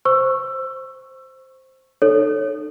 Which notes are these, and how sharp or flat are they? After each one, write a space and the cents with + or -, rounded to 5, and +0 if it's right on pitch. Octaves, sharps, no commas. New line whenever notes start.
C5 +0 C#6 -10 E6 +20
D#4 -35 A4 +0 C#5 +0